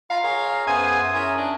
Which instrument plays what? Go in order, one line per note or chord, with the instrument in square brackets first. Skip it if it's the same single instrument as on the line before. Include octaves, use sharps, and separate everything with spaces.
[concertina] F4 A#5 B5 [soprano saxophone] F5
[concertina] G#4 A#4 C#5
[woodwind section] F#2 E5 D#6 [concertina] B3 G#4 C5 [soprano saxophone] G#5
[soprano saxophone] E4 [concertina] G#4 A#4 C#5
[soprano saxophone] D4 [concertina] A#5